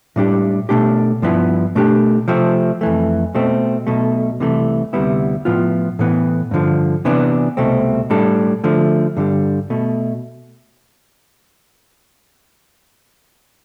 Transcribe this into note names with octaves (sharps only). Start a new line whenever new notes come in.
A2 G3 D4 G4
B2 A3 D4 G4
G2 F3 B3 E4
B2 A3 D4 G4
C3 F3 A3 C4
F2 E3 A3
B2 A3 C4
B1 B2 A3
C2 C3 E3 A3
D2 C3 G3 B3 E4
A2 F3 B3 F4
A2 E3 B3
G2 D3 F3
C3 E3 B3 D4
C2 B2 A3 C4
A2 G3 D4 A4
D3 F3 A3
G2 D3 G3
B2 A3